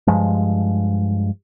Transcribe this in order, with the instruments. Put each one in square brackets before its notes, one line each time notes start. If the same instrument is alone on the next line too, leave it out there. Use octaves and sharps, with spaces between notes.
[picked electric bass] G2 F3 G#3